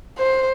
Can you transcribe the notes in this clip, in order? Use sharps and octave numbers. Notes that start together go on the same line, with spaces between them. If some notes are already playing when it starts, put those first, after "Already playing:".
C5